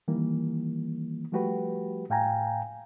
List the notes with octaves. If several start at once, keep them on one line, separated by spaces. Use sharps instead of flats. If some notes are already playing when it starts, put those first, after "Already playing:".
D#3 E3 G3 A#3
F3 G3 A3 F#4 G4 B4
A2 F5 G5 G#5 A#5